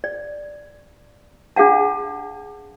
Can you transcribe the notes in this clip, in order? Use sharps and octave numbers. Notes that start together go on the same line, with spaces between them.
D5
D4 G#4 F5 F#5 A5